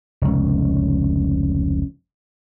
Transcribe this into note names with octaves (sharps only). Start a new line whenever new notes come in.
F1 C#2